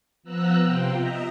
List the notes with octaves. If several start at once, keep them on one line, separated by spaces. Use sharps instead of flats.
F3 B3 A#5 E6 F#6
C3 F4 G5
D#5 E5 A#5